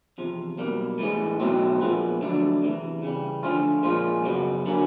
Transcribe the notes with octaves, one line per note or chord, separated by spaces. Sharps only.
E2 C3 F3
B1 B2 G3 A#3
A2 E3 G#3
B2 F#3 A3 C4
A#2 F3 G#3 B3
F2 D3 F#3 A3 D4
E2 C3 E3
C#3 E3 G3
D3 F3 A3 C#4 F4
A#2 F3 G#3 C#4 F4
F#2 C#3 F#3 B3
D3 F#3 A#3 C#4